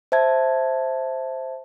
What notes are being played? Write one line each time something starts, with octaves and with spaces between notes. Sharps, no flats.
C5 E5 A5 G#6